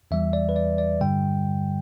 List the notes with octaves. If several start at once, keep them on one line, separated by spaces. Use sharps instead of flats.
E2 E3 G3 E5
D5
B4
D5
D5
G2 D3 G3 G5